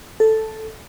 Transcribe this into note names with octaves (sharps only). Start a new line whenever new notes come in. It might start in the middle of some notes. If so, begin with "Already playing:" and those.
A4